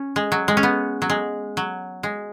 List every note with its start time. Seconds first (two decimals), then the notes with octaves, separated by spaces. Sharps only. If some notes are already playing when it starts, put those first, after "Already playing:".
Already playing: C#4
0.16 G#3
0.32 F#3
0.48 G#3
0.57 C#4
0.63 B3
1.02 F#3
1.10 G#3
1.57 F#3
2.03 G#3